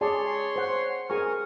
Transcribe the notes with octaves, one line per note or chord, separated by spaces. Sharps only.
G#4 C#5 D5 A5 C6
C5 F#5
G#4 A#4 G#5 C#6